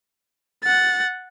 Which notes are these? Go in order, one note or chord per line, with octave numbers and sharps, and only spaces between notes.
F#5 A6